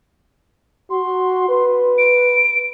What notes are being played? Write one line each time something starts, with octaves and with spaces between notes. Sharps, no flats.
F#4 C6
B4
D7